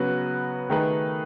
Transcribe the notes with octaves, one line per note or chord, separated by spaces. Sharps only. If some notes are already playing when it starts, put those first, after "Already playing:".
Already playing: C#3 F#3 B3 F#4 B4
D#3 A3 D#4 G#4 B4